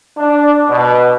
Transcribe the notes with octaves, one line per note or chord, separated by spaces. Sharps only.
D4
B2